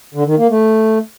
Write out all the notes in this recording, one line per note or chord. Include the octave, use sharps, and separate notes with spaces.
D3
D#3
A#3
A3